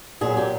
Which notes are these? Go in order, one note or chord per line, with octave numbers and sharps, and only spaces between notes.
A#2 F#3 G#4
G4